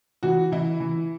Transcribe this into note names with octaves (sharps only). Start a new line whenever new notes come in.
E3 F#4
E3 E4
E3